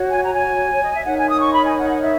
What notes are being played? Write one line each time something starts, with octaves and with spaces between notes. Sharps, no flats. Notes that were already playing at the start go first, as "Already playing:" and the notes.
Already playing: F#4 C#5
G#5
A#5
G#5
C#5
D#5
E5
D#4 A#4 C#5 F#5
G#5
D#6
C#6
B5
G#5
F#5
F#5
E5